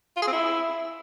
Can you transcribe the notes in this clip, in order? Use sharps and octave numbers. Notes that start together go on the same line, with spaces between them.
F4
G#4
C4
E4